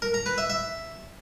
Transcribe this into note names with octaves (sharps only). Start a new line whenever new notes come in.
A#4
A#5
B4
E5
E5